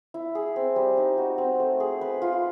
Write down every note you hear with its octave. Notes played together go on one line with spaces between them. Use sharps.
E4
G#4
C4
G3
D#4
F#4
C4
A3
G#4
B4
F4